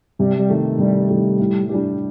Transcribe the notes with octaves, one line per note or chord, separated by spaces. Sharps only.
C3 G3
G3
D#3 A3
C3 G3
D#3 A3
A2
G3 D4 G4